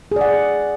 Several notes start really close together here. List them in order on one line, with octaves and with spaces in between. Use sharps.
G#4 D5 F#5